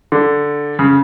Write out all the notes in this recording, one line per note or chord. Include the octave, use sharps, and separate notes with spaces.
D3
C#3